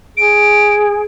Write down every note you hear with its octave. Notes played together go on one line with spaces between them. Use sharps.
G#4 D7